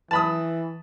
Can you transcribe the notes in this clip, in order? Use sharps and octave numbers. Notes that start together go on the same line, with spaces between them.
E3 A5 B5 D#6